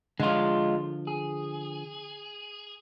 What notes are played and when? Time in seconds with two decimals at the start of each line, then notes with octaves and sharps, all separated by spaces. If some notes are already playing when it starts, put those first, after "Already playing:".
0.20 D3 F3 G#3 F4
1.07 G#4